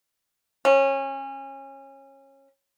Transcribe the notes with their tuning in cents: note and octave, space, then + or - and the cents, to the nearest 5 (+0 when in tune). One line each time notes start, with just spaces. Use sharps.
C#4 -25